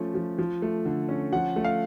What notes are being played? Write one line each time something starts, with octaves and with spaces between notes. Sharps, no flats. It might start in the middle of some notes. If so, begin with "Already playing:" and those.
Already playing: F3 A3 C#4
F3
F3
A3
D3
C#4
F3 F#5
A3
F5